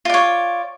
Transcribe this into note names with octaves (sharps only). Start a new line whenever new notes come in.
F4 C#5 D5